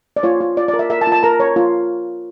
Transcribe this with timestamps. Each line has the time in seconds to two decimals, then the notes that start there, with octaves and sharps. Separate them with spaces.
0.16 D5
0.23 F4 C#5
0.41 F4
0.57 F4 D5
0.68 D5
0.74 A#4
0.79 E5
0.90 A#4 E5
1.01 A5
1.07 F4
1.12 A5
1.23 A#4 A#5
1.40 C#5
1.56 F4